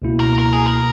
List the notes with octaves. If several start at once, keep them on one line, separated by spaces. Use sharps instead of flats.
C#2 B2 A#3 E4
A#4
A#4
G#4
A#4
B2